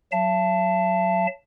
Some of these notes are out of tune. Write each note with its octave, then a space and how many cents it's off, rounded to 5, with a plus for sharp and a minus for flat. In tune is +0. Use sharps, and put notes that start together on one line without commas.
F#3 +0 E5 +45 A5 +0